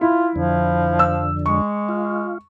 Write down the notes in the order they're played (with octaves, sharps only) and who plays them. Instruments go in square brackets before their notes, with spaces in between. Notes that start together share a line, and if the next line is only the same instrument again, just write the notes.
[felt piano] E4 [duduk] F4
[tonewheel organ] F2 D3 [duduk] F3
[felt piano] E6
[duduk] G#3 [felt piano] C#6
[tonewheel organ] F4